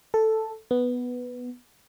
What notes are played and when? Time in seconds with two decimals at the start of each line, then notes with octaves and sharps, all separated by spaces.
0.14 A4
0.71 B3